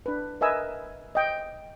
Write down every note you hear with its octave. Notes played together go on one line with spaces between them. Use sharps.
D4 B4
A#4 B4 D#5 E5 G#5 E6
D#5 G5